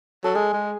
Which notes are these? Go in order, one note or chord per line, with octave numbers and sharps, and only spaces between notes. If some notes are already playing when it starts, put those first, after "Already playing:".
F#3 A4
G#3 G#4
G#3